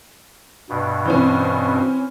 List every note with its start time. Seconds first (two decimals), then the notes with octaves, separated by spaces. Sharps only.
0.69 G2 B2
1.06 E3 C4 C#4